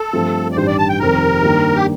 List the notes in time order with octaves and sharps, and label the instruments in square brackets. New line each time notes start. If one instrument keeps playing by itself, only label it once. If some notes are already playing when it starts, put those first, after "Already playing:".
Already playing: [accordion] A4
[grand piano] G2 F3 A3 C4
[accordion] D5
[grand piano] A1 G2 D#3 G3 D4 [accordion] C5
[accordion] D5
A5
G5
[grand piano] F1 F2 D#3 G3 [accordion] A#4
[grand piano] G2 D#3 A#3 D4
[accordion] G4